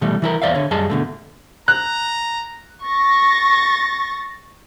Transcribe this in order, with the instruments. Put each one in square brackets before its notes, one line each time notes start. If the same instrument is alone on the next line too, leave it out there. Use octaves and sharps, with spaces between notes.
[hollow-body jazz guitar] B2 E3 G3 A3
E3 E4 A#4
E2 C5 D5 E5 F5
D3 C#5
F#2 G3 G#4 D#5 A5
B2 D3 A3
[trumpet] A#5 [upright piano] F#6
[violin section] C#6 A6 A#6